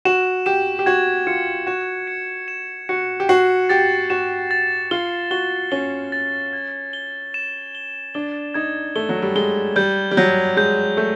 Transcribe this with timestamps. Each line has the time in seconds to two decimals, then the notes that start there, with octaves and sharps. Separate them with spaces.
0.05 F#4 E7
0.46 G4 E7
0.79 G4
0.86 F#4 G#6
1.27 F4 C#7
1.67 F#4 E7
2.07 C#7
2.48 E7
2.89 F#4 C#7
3.20 G4
3.29 F#4 C7
3.69 G4 A6
4.10 F#4 E7
4.51 A6
4.91 F4 G7
5.31 F#4 G7
5.72 C#4 G7
6.12 A6
6.53 G#6
6.93 G7
7.34 E7
7.75 G7
8.14 D4 G7
8.54 D#4 G#6
8.96 A3 G7
9.09 F#3
9.22 G3
9.35 G#3 G7
9.76 G3 G6
10.11 G3
10.17 F#3 G6
10.57 G#3 G6
10.97 A3 G6